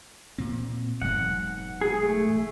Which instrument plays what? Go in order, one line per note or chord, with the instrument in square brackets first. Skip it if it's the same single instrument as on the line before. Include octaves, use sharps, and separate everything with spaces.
[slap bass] A#2 C4
[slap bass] E1 G#2 F#3 [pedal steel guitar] F#5
[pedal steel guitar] G#4
A3